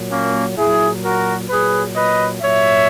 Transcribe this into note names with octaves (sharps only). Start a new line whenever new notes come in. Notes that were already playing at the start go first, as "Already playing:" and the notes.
Already playing: A#2 F#3
A#3 C#4
A#2 F#3 E4 G#4
F#4 A#4
A#2 F#3 G#4 B4
B4 D#5
A#2 F#3 C#5 E5